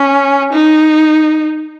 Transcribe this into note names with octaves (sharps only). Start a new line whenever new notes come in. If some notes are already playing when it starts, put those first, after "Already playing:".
Already playing: C#4
D#4